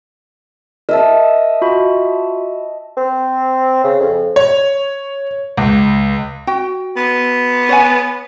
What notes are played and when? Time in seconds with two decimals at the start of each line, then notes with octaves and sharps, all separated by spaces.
0.89 A#4 D#5 E5 A5
1.61 F4 F#4 B5
2.97 C4
3.84 C#3
4.00 F2
4.36 C#5
5.57 C#2
6.47 F#4 G5
6.97 B3
7.69 C#5 F#5 G#5